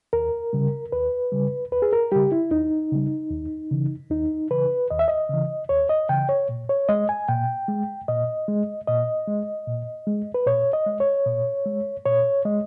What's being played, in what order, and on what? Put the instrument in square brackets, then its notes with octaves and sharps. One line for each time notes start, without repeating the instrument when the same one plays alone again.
[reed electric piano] D#2 A#4
C#3 G3
D#2 B4
C#3 G3
D#2 B4
G#4
A#4
C#3 G3 G4
E4
D#2 D#4
C#3 G3
D#2
C#3 E3
D#2 D#4
C#3 E3 B4
D#2 D#5
E5
D#5
C#3 E3
D#2 C#5
D#5
C#3 E3 G5
C#5
A#2
C#5
G#3 D#5
G#5
A#2 G5
G#3
A#2 D#5
G#3
A#2 D#5
G#3
A#2
G#3
B4
A#2 C#5
D#5
G#3
C#5
A#2
G#3
A#2 C#5
G#3 D#5